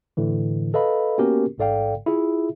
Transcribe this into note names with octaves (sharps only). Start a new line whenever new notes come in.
A2 D3 E3
A4 B4 D#5 F5 B5
A#3 B3 C#4 F#4 G4 A#4
A1 G#2 A4 D5 F5 G5
E4 F4 G#4 E5